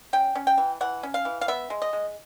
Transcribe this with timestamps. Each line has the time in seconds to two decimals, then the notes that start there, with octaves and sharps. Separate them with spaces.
0.13 C#4 G5
0.35 C#4
0.47 G5
0.58 E3
0.81 E3 F#5
1.03 C#4
1.14 F5
1.25 E3
1.41 F5
1.48 B3 E5
1.70 G#3
1.82 D#5
1.93 G#3